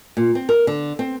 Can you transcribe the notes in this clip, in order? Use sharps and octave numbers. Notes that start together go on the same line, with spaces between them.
A#2
C4
A#4
D3
C4